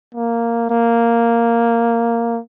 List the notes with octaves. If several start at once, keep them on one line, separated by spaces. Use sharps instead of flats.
A#3
A#3